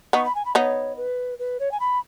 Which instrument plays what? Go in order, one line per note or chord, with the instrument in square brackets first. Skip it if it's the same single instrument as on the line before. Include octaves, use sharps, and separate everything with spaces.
[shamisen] B3 D#4 [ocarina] C#6
[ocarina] B5
G#5
B5
[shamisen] B3 D#4 [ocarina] C#5
[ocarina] B4
B4
C#5
G#5
B5